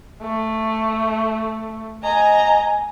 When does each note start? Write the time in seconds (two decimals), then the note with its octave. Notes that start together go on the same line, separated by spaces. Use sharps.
0.22 A3
2.03 D#5 G#5 A#5